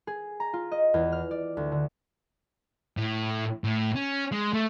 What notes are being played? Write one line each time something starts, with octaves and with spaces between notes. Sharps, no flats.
G#4
A#5
F4
D#5
E2
F6
D5
D2
D3
A2
A2
C#4
G#3
A3